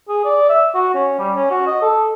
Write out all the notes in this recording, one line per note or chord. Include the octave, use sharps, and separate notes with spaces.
G#4
D5
E5
F#4
C#4
G3
C#4
F#4
D#5
A4